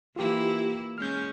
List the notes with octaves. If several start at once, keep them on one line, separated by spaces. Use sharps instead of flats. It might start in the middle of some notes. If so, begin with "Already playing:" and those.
E3 A#3 E4 F4 G4
G#3 C#4 F6 G6